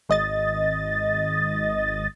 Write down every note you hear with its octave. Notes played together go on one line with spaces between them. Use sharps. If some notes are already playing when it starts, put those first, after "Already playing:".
G#1 D#5 A6